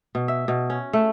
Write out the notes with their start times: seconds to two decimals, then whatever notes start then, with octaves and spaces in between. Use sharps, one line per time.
0.15 B2
0.28 E5
0.48 B2
0.70 C#4
0.93 A3